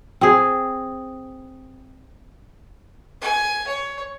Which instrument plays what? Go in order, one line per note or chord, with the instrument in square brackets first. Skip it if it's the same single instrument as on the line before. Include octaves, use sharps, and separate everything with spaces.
[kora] C4 G#4
[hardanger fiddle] G#5
C#5